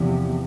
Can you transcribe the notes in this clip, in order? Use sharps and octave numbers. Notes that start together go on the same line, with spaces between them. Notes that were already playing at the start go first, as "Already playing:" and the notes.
Already playing: E2 C3 F3